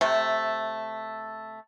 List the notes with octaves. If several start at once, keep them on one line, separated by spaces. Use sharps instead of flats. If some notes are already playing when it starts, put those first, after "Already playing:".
C3 A3